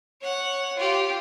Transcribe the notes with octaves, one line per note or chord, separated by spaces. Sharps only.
C#5 F#5
F4 G4